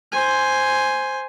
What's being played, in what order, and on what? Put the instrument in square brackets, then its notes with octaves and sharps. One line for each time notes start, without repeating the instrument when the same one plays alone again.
[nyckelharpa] C5 G#5